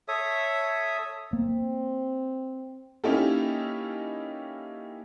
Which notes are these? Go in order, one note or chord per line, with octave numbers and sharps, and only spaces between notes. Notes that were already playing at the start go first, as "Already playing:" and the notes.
A4 C#5 E5 D#6
A#3 C4
A#3 C#4 D#4 E4 G4 A4